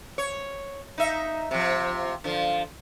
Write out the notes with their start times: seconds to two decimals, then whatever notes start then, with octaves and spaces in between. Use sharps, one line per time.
0.18 C#5
0.98 D#4 E5
1.51 C3 F3
2.24 D3 F3